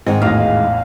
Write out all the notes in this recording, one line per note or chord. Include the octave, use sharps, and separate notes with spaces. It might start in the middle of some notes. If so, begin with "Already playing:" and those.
G#2 D#3 G#3 C4 C5 F#5
A1 E2 A3 D#4 F#4 F5 A#6